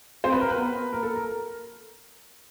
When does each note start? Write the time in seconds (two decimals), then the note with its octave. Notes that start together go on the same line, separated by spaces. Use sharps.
0.24 C4 C5
0.33 B4
0.41 A#4
0.50 B4
0.58 B3
0.92 A#3 A#4
1.03 A4
1.15 A#4